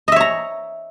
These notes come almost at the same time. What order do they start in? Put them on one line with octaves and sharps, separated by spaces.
D#5 E5 C#5 A#5